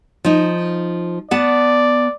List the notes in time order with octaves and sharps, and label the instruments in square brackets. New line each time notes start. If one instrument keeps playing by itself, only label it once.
[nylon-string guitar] F3 D#4
[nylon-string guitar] B3 F#5 A5 [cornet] D5